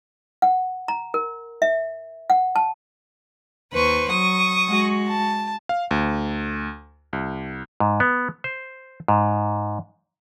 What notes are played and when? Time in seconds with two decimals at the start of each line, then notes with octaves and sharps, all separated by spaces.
0.42 F#5
0.88 A#5
1.14 A#4
1.62 E5
2.30 F#5
2.56 A5
3.73 D#2 B4 C5 C#6
4.09 F#3 C#6 D#6
4.68 G#3 F#4
5.08 A5
5.69 F5
5.91 D2
7.13 C2
7.80 G#2
8.00 B3
8.44 C5
9.08 G#2